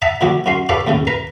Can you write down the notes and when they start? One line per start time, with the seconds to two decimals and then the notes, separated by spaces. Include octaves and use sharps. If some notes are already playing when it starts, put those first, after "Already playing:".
0.02 D#5 E5 F#5 A5 A#5
0.21 A#2 D3 F3 G3 F#4 G4
0.46 F#2 C#4 F#4 C6
0.69 G4 A4 B4 C#5 D5 F5
0.87 D#2 A2 C#3 C#4
1.07 A#4 B4 A#5